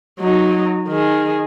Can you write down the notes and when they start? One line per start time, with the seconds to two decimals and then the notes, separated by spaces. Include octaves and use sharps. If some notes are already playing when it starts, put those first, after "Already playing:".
0.20 F#3 D#4
0.88 D#3 G#4